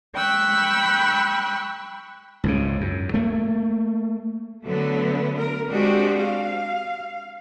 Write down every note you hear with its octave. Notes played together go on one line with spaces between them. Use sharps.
G5 B5 C#6 E6 F#6
C#2 G#2 C#3
F#2
A3 A#3
D3 F#3 A3 B3
A#4
G#3 C4 D4 F#4 G4
F5